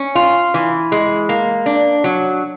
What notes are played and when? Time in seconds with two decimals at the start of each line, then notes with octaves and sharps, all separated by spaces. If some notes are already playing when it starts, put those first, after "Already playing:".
Already playing: C#4
0.15 F4
0.54 E3
0.92 G#3
1.29 A#3
1.66 D4
2.04 F#3